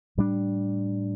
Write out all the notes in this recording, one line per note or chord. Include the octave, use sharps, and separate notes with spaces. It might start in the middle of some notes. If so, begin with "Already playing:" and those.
A2 G3 D4